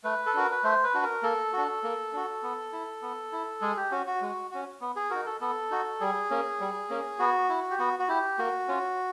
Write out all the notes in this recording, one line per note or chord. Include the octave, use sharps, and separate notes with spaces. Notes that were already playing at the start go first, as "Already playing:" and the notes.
A3 B4
A4
D4 F#4 A#4
B4
A3 C5
B4
D4 F#4
A#4
A#3 A4
D4 F#4
A#3
D4 F#4
B3
E4
B3
E4
G#3 G#4
G4
C#4 F#4
F#4
G#3
C#4 F#4
B3
G#4
D#4 F#4 A#4
A4
B3 A4
D#4 F#4
G3 G#4
A#3 C#4
G3
A#3 C#4
B3 F#4
E4
G4
B3 F#4
F#4
E4 G4
A#3 F#4
C#4 F4